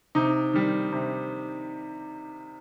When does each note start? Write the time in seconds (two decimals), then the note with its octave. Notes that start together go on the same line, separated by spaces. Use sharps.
0.15 C3 D#4
0.53 D#3 G3
0.93 C3